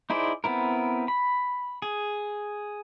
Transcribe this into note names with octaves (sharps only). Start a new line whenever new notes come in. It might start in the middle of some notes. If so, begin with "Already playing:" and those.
D#4 E4 G#4 C5 D5
B3 C4 E4 A#4
B5
G#4